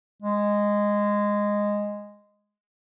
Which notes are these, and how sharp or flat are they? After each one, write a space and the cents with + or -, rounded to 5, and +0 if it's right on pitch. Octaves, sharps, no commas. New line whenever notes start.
G#3 -10